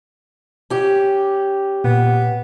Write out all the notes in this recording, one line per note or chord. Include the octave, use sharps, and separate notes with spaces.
C#4 G4
A#2 B3